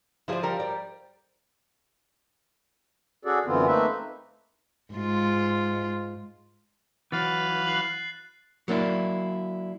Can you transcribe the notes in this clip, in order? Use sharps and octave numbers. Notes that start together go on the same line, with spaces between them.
F3 E4 G4 G#4 C5 D5
G3 A#4
D5
C#4 F#4 G#4 A4 D5
F#2 D3 E3 B3 C4 F4
A3 A#3 C4 D#4 B4 E5
G#2 F4
E3 F#3 B4 F5 A6
F#6 C7 F#7
F#3 A#3 D4 E4